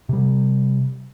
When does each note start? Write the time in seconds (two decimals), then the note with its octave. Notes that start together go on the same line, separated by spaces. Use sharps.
0.09 C3 G3